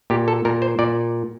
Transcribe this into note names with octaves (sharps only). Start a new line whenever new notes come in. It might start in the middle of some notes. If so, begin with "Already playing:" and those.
A#2 G4
A4
A#2 A#4
C5
A#2 D5